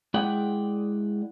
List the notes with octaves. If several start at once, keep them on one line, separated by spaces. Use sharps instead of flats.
G#3 E4 G#4 D5 F#5 G5